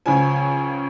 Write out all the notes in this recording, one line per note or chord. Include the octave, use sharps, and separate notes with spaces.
C#2 C#3 F3 G#5